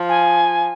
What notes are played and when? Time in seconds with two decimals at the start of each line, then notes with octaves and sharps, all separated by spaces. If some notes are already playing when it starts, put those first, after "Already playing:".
Already playing: F3
0.09 G#5